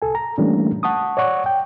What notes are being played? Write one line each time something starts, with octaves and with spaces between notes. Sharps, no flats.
C2 A4 G#5
A#5
E3 G3 A3 A#3 C#4 D4
F#5 A5 C#6 D#6
C#5 D5 F#5 C#6
G5